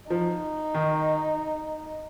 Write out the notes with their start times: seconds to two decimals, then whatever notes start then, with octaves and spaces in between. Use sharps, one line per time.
0.10 F3 D#4
0.74 D#3